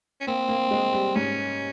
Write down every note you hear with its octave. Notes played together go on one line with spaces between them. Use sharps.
C#4
A#3 C4
A#3
G#3
G3
G#2 C#4